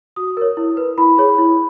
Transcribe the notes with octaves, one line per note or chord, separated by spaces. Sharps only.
F#4 D#6
A#4 C#5
E4
B4
E4 B5
G#4 C#5
E4